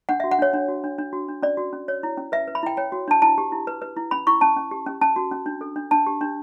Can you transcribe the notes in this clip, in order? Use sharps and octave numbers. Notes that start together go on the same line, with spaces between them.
D4 F#5
E5
F#4
F#5
D4 C#5
D4
F#4
D4
D4
F#4
D4
C#4 D5
F#4
C#4
C#5
E4
C#4
B4 E5
B4
B5
E4 G5
C#5 G5
F#4
D4 A5
E4 A5
G4
E4
B4
B4
E4
C#4 B5
E4 C#6
C#4 A5
C#4
G4
C#4
C#4 A5
F#4
C#4
D4
A4
D4
D4 A5
G4
D4